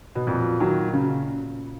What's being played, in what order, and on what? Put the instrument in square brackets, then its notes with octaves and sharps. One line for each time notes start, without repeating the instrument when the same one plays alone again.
[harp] B2
[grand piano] F2 [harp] A#2
[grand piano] D#3 F#3
C#3